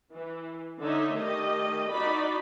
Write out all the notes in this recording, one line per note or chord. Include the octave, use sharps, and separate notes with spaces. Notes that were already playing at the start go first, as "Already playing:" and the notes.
E3
D3 D#4 C#5 E5
D#3 G3 A3 G4 D#5
D#4 E4 F#4 D5 B5